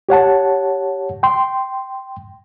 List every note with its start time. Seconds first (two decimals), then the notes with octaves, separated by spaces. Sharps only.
0.09 G4 C#5 F#5 A5
1.23 G5 C6